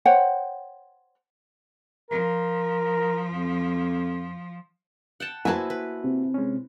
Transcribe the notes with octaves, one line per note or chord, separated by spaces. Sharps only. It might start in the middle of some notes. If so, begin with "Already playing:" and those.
C5 C#5 F#5 G5
F3 A#4
F2
F#5 G5 A5
A#3 E4 F#4 B4 C5 E5 G#5 A5
B4
C3
G#3 C#4